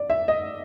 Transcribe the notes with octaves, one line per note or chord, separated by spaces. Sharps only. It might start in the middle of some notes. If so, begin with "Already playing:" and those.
Already playing: D5
E5
D#5